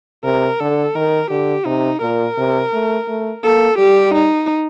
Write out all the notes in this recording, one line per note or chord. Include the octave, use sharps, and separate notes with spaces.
C3 A#4
D3 A4
D#3 A#4
D3 G4
C3 D#4
A#2 A#4
C3
A3
A3
A#3 A4
G3 G4
D#4